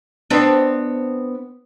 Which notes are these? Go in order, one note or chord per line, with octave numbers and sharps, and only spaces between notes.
B3 C4 D4